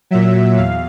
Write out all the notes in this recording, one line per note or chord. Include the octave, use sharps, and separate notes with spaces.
A#2 F#3 E5
E2 F5